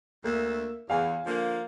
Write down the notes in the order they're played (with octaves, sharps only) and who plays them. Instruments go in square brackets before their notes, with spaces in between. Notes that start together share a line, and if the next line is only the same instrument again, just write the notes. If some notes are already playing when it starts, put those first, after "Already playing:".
[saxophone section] D2 E5 [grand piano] A#3
[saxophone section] E2 [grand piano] F5 G#5
[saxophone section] D3 F3 A#3